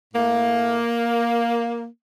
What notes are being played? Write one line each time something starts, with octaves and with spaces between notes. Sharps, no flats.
A2 A3 A#3